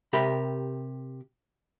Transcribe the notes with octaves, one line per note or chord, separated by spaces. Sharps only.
C3 G4 A#4 B5